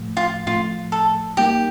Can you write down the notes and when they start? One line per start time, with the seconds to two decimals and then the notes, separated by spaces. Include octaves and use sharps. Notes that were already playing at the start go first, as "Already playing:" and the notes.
Already playing: A2 F3 A3
0.17 F4
0.46 A2 F3 A3 F4
0.92 A4
1.37 G3 A#3 D#4 G4 A#4